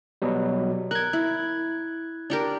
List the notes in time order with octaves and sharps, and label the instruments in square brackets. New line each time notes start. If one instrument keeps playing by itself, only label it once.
[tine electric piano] B2 F#3 G3
[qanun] A#4 [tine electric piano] F#6 G#6
[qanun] E4
D4 G4 A#4